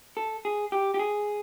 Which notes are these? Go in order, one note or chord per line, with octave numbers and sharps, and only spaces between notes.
A4
G#4
G4
G4
G#4